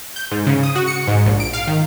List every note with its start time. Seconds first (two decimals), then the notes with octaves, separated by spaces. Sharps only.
0.16 G6
0.31 G#2
0.47 C#3
0.63 D#6
0.75 F#4
0.87 C#7
1.07 G#2
1.26 A#1
1.40 D7
1.53 F5
1.67 D#3